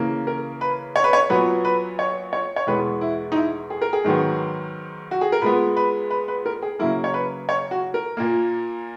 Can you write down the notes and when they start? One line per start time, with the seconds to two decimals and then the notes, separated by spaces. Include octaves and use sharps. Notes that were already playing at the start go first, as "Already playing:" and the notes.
Already playing: C#3 E3 A#3
0.27 A#4
0.61 B4
0.96 C#5
1.04 B4
1.13 C#5
1.30 A#2 F#3 B3 B4
1.65 B4
1.99 C#5
2.33 C#5
2.56 C#5
2.67 E2 B2 G#3 B3 B4
3.01 E4
3.32 D#4
3.36 E4
3.70 G#4
3.82 A#4
3.93 G#4
4.04 G#2 D#3 F#3 B3
5.11 F#4
5.21 G#4
5.32 A#4
5.42 A#2 G#3 B3 B4
5.77 B4
6.10 B4
6.28 B4
6.46 A#4
6.62 G#4
6.79 C#3 F#3 A#3 E4
7.04 C#5
7.14 B4
7.49 C#5
7.71 F#4
7.94 A#4
8.17 A#2 A#3